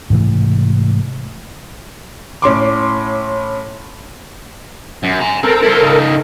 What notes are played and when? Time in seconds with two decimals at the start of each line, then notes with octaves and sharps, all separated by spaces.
0.10 G#2 C3 E3 A3
2.42 A2 C#4 C6 D6
5.03 F#2
5.20 G#5 A#5
5.43 C4 A4 A#4
5.63 E4 C5
5.81 C#3 D#4